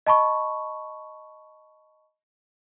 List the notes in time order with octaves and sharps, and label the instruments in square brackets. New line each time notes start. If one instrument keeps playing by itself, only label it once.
[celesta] D#5 A5 B5 C#6